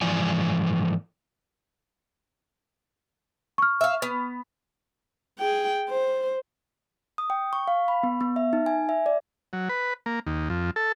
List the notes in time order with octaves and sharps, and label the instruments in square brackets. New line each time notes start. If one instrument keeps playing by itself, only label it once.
[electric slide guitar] G#2 E3 F3 D5 G#5
[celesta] C#6 F6
[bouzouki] E5 F5
B3
[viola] G#4 G5
C5
[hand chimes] D#6
G5
C#6
F5
B5
B3
B3
E5
D#4
G#5
E5
D5
[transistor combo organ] F#3
B4
A#3
D#2
F2
A4